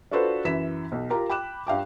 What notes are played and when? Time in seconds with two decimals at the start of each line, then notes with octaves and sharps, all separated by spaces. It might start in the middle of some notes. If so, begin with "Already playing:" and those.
0.11 D4 F4 F#4 A4 B4 C5
0.45 F#2 E3 B6 E7
0.92 B1
1.10 F4 G4 A#4 A#5
1.29 G5 B5 D6 F#6 E7
1.67 G2 F5 G5 D6